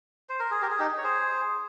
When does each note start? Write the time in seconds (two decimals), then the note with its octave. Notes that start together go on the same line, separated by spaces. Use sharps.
0.29 C5
0.40 A#4
0.51 G#4
0.62 G4 A#4
0.71 G#4
0.79 D#4 G4
0.98 C#5
1.04 G#4 C5